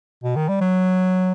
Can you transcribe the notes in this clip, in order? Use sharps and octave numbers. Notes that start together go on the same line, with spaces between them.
B2
D#3
G3
F#3